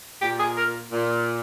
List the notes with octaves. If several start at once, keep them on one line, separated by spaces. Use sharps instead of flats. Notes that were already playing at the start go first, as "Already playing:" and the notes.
A#2 G4
G#4
A#4
A#2